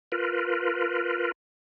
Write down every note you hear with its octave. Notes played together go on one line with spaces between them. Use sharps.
F4 A#4 B4